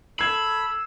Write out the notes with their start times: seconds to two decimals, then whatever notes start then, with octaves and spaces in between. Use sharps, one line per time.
0.19 A4 B5 E6 G#6 C7